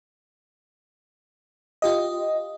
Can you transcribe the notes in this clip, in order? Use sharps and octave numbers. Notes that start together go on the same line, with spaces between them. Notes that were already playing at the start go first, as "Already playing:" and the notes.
F4 G4 D#5